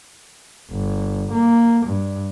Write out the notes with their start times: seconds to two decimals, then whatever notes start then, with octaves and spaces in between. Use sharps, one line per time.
0.71 G1
1.33 A#3
1.87 G2